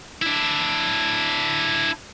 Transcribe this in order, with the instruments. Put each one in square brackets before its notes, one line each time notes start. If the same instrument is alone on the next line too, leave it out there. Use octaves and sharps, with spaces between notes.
[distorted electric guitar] D4 E4